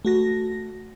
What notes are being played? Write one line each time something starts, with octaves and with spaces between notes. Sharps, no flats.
A3 F#4 A#6